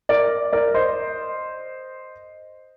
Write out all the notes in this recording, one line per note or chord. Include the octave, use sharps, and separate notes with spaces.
A#4 D5
A#4 D5
C5 D#5